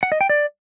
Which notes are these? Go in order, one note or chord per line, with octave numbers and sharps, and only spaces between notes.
F#5
D#5
G5
D5